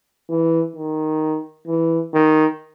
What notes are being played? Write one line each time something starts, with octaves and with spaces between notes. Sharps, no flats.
E3
D#3
E3
D#3